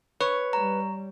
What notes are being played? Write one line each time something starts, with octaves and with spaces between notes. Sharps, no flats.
B4 C#5
G3 A#5